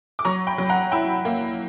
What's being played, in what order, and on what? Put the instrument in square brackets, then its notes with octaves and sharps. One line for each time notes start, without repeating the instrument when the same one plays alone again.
[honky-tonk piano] D6
F#3 A#5 C#6
G5 B5
F#3
F#5 A#5
E4 G5 B5
A#3